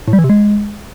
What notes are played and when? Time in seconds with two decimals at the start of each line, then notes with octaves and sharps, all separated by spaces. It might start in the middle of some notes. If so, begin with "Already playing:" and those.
0.08 A2
0.13 G3
0.19 E3
0.24 C3
0.30 G#3